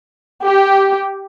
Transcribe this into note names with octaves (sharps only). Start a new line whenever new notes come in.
G4